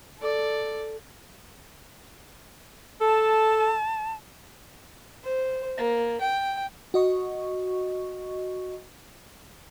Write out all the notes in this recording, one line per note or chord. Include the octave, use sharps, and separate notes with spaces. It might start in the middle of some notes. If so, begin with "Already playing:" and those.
A4 D5
A4 A5
C5
A#3
G5
F#4 D#5 C#6